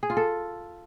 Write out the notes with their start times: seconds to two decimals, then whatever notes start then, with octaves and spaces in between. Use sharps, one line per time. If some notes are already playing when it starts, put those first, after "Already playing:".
0.03 G#4
0.10 F4
0.17 A4